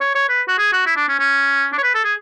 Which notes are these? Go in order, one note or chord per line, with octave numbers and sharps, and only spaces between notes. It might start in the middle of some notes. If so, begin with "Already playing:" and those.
C#5
C#5
B4
F#4
G#4
F#4
E4
D4
C#4
C#4
D4
C#5
B4
A4
G#4